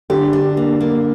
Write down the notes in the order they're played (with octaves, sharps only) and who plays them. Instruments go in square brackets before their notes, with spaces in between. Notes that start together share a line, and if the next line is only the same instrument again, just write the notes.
[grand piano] D3 [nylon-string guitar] G4
[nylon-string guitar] D4
A#3
A#3